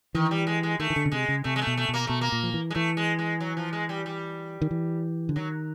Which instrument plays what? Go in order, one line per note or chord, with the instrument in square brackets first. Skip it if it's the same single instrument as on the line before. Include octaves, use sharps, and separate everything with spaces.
[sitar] D#3 [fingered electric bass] E3
[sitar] G3
G#3
G#3
[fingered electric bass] D#3 [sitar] A3
[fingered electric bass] D#3
D3
C#3
[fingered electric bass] C3 [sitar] G#3
[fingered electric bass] C#3
[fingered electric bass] C3 [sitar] A3
[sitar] G#3
A3
[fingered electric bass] B2
[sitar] A3
[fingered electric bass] B2
[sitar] A#3
[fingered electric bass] B2 [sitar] A3
[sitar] A#3
[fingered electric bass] A#2
F3
E3
[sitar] G#3
[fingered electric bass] E3 [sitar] A3
[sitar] G#3
G#3
F#3
F3
G#3
G3
G3
[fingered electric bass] D#3
E3
D3
[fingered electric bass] D#3 [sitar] F#3